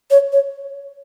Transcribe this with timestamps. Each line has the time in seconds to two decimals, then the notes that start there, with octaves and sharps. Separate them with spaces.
0.11 C#5
0.33 C#5